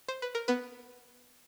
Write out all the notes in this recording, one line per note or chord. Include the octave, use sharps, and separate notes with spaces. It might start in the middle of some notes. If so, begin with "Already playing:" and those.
C5
B4
A#4
B3 B4